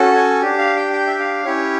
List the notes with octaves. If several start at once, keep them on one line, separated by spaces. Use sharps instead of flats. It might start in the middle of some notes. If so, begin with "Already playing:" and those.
Already playing: C#4 F#4 A4
G#5
D4 G4
F5
G5
G5
E5
F5
C#4 E4 G4 C#5